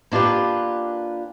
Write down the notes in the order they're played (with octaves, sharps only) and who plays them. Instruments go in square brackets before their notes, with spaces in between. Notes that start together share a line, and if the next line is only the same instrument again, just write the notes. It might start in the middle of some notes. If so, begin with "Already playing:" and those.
[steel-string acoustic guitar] A#3 D4 F4 G4 B4